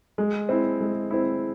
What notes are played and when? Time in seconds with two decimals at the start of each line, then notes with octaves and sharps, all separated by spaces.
0.18 G#3
0.49 C4 E4
0.80 G#3
1.11 C4 E4